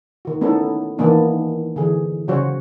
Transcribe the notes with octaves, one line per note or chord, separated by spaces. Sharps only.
D#3 F#4
A3 B3 C#4 D#4 E4 A4
D#3 E3 A#3 B3 D4 E4
D3 E3 G#4
C#3 F#3 F#4 C5 C#5